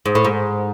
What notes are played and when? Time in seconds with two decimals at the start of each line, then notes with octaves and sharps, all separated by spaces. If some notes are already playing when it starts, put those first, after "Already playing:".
0.06 G#2
0.15 A2
0.25 G#2